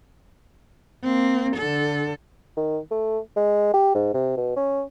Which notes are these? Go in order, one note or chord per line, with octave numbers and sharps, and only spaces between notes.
A#3 C4
D3 A4
D#3
A3
G#3
G4
G#2
C3
B2
C#4